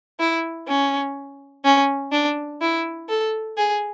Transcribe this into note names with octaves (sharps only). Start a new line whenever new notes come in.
E4
C#4
C#4
D4
E4
A4
G#4